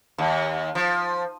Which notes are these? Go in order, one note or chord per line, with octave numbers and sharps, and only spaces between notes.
D#2
F3